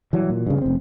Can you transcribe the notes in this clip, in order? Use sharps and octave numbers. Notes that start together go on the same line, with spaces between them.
E3 F#3 G3
A#2
G2 C#3
F1 C4